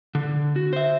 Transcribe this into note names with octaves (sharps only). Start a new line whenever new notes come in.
D3
F#4
C5 E5